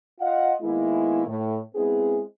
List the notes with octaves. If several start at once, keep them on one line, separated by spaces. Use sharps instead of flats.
F4 D#5 F5 F#5
D#3 G#3 A#3 B3 E4
A2
G#3 B3 C4 E4 G#4